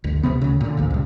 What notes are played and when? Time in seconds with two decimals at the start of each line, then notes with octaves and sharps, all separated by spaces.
0.04 G1 D2
0.23 C#2 G#2 C3 B3
0.42 D2 C#3
0.61 A#2 D3
0.77 G#1 D2 A#2
0.91 C#2 G2